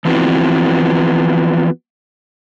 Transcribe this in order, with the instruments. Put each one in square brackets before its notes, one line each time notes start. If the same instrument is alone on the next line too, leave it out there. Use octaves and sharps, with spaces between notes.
[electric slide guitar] E3 F3 B3 C4 E4 F#4